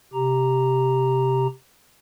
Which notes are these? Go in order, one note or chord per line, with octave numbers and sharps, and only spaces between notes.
C3 G4 A#5